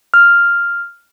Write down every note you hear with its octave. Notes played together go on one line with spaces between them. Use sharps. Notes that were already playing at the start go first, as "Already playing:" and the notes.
F6